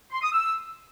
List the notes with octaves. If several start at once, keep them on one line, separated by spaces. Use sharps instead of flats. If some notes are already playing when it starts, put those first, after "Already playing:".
C6
D#6
E6